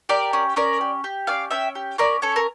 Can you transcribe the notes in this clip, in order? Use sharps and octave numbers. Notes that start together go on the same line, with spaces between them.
G4 A#4 D5
C#4
C#4 A#4 D5
G4
G4
C#4 D5 F5
C#4 E5 G5
G4
C#4 A#4 D5
C#4 A4 C#5
A#4